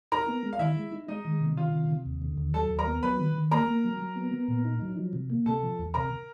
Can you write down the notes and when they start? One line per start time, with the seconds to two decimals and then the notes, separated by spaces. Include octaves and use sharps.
0.12 D#4 A#4 A#5
0.28 B3
0.43 G#3
0.53 F5
0.59 D#3 E4 E5
0.76 G#3
0.92 D#4
1.08 G#3 D#4 D#5
1.25 D#3
1.40 C3
1.57 D#3 F4 F5
1.73 C3
1.89 C3
2.06 D#2
2.22 D3
2.38 D#2
2.54 F#3 A4 A5
2.70 D#2
2.79 A#4 A#5
2.87 B3
3.03 F#3 B4 B5
3.19 D#3
3.36 D#3
3.51 A#3 A#4 A#5
3.68 A#3
3.84 F#3
4.00 F#3
4.16 B3
4.32 B3
4.48 A#2
4.65 D#4
4.82 F#3
4.97 F3
5.13 C3
5.30 A#3
5.46 C3 A4 A5
5.63 F3
5.79 E2
5.94 C3 A#4 A#5